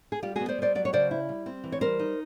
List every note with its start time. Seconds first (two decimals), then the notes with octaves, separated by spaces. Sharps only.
0.12 G#4
0.23 G3 F4 G4
0.36 F#4 G#4
0.41 B3
0.49 C5 D5
0.59 G3 C5 D5
0.75 F#3 D5
0.85 C#5
0.93 C#3 C5 D5
1.11 E4
1.29 G3
1.46 C4
1.64 E3
1.72 C#5
1.81 G3 A#4 C5
1.99 D#4